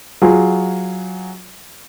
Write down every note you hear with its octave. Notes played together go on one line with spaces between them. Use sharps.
F#3 F4 G#4